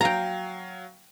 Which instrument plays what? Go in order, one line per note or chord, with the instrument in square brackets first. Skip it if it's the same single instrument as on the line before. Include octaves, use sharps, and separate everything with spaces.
[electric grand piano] F#3 F5 [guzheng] G5 A#5